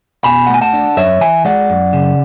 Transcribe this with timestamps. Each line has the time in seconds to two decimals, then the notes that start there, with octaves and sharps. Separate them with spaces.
0.24 B2 G#5 B5
0.47 F#5
0.49 A3
0.54 G#5
0.61 F#5 A5
0.73 D4
0.97 F#2 C#5 E5
1.21 E3 E5 G#5
1.45 G#3 D5 F#5
1.70 F#2
1.93 C#3